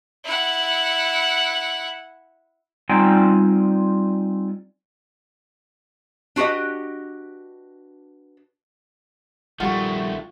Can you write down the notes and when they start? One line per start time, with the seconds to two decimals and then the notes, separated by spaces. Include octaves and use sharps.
0.25 E4 F#5
2.89 G3 C4 D#4 F4 G5 G#5
6.36 D4 F#4 G4 B4 D#5
9.60 A#1 D#3 G3 A3 F4 F#4 F#5